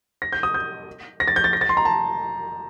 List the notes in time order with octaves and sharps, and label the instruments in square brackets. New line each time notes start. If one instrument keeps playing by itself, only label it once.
[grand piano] A#6
G6
D#6
G6
A#6
A6
G6
A6
A#6
A6
C6
A#5
A5